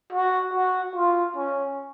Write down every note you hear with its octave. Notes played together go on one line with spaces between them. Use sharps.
F#4
F#4
F4
C#4